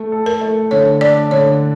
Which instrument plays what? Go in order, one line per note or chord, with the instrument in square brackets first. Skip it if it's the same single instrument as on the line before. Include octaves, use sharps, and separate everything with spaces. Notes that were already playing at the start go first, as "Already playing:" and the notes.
Already playing: [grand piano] A3
A4
[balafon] A#4
[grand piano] A3
[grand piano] D3 [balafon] C#5
[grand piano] D4 [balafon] D5
[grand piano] D3 [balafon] C#5